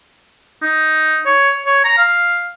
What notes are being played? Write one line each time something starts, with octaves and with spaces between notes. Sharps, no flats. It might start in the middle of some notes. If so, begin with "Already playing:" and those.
D#4
C#5
C#5
A#5
F5